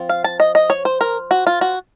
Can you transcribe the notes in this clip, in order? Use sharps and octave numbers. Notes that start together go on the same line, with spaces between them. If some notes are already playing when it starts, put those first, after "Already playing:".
Already playing: F3 C4
F5
A5
D#5
D#5
C#5
C5
A#4
F#4
F4
F#4